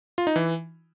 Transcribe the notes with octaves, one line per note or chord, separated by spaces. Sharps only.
F4
D#4
E3